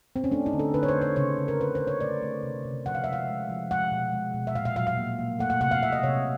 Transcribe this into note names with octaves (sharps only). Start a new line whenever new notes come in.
C4
C#4
A3 D4
D#4
D3
A4
D3 B4
C#5
C5
A3
C#5
C#3 C#5
C#3
A#4
C#3 B4
C5
C#3
C#5
A3 D5
A3
C3
C3
F3 F#5
F5
G#3 E5
F5
G#3
F3
G#3 F#5
B2
G#3
B2
E5
A#2 F5
F5
F#3 F5
F5
A#3
A#3
A3 F#5
F#5
C3 F#5
F5
C3 E5
D#5
C3 C#5